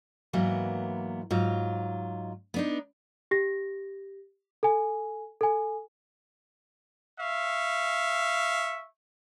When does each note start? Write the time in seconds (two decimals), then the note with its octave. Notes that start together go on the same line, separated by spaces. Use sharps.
0.33 G#2 E3 F#3 A#3 B3
1.31 G#2 F#3 F4
2.54 B3 D4 D#4
3.31 G4 A#6
4.63 A4 G#5
5.41 A4 G#5
7.19 E5 F5 C#6